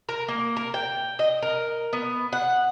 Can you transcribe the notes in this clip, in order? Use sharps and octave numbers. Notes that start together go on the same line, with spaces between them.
A#4
A#3
A#4
G5
D#5
A#4
B3
F#5